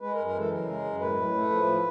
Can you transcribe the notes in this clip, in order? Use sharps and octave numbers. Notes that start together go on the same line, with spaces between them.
G#3 B4
A#4
F#2
A#4
E3 A4
C#3 A#4
G#3
F#2
A2 B4
A2
A3
F3
A2